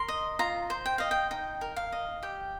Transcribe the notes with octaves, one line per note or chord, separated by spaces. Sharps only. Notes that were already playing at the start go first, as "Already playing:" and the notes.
Already playing: A#4 C6
D#5
F4 A#5
C5
G5
D#5 F5
G5
D#4 G5
A#4
F5
D#5
G4 G5